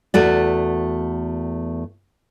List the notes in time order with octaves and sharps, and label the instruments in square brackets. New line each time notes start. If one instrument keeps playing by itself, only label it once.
[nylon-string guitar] E2 A3 F#4 D5